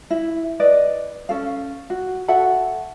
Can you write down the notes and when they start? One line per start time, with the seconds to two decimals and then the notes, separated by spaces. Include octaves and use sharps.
0.10 E4
0.60 B4 D5 D#5
1.29 C#4 A4 F5
1.90 F#4
2.28 F#4 A4 E5 F#5